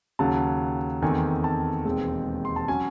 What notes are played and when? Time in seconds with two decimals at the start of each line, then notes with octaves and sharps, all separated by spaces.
0.19 D#2 C#3 F#3 A5
1.02 E2 D#3 A3 C4 G#5
1.44 A5
1.85 E1 D#2 D#3 G#3 C4
2.45 C6
2.56 A5
2.68 F#3 C#4 G#5